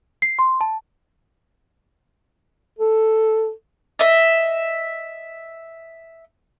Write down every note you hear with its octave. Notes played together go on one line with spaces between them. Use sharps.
C7
C6
A5
A4
D#5 E5